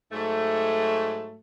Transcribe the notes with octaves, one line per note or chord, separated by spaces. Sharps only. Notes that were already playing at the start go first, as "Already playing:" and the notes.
G#2 F#3 A3